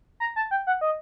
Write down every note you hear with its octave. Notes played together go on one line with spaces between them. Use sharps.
A#5
A5
G5
F#5
D#5